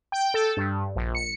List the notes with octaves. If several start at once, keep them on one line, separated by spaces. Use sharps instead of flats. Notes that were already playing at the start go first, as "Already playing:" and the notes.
G5
A4
G2
A#1
C#7